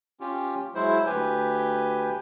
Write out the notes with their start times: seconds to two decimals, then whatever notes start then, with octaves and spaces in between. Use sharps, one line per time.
0.20 C#4 F4 G4
0.75 F#3 G#3 E4 C5
1.06 D2 G4 B4 G#5 G6